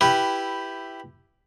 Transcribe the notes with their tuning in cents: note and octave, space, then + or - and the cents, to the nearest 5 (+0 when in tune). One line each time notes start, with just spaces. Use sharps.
E4 +5 G4 -5 B4 +0